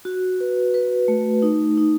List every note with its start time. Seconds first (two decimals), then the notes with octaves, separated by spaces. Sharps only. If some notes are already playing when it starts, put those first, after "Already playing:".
0.05 F#4
0.40 B4
0.74 B4
1.08 A3
1.42 D#4
1.78 D#4